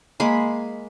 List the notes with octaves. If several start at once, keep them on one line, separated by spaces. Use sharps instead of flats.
G#3 A#3 B5